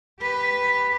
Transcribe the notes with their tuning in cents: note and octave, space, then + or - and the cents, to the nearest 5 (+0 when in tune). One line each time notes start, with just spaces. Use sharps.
G4 +0 B4 +0